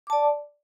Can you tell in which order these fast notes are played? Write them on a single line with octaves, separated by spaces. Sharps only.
D6 A5 D5